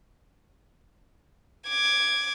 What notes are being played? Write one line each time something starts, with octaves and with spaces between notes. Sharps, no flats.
D6 G#6